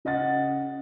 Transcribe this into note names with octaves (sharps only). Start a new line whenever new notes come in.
C#3 D#5 F#5 A6